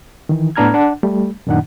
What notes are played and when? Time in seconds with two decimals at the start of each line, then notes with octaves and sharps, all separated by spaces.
0.29 D#3 E3
0.56 A2 B3 D4 A#5 F6 G#6
0.74 D4 F#5
1.03 G3 A3
1.47 F#2 A#2 D#3 D4 D#4 F#5